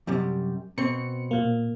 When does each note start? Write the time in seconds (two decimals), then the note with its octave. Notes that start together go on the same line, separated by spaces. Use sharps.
0.07 F#2 C3 G3
0.78 B2 C4 C#7
1.31 A#2 A#3